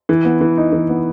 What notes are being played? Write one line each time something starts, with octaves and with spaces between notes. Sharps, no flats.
E3
B3
E3
D#4
E3
B3